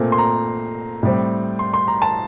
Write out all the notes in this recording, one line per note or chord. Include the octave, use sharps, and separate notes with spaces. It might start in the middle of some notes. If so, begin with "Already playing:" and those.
Already playing: A#2 A3 C4
C6
A#5
A2 G3 C4
C6
C6
A#5
A5